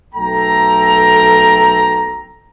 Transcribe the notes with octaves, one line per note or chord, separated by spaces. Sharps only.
B1 A3 A4 G5 A#5